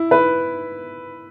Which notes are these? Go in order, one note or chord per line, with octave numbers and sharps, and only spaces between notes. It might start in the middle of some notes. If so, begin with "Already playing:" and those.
Already playing: E4
B4